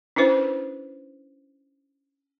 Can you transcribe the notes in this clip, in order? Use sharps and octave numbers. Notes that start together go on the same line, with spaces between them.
C#4 D4 E4 B4 C5